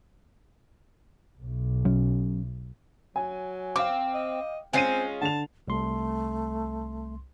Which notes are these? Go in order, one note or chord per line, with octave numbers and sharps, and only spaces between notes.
B1
F#3 C#4
F#3 G#5
C4 F5 G5 D6
D#5
G#3 C4 C#4 F4 G#5 C7 D#7
D3 A5 F7
C2 A3 C6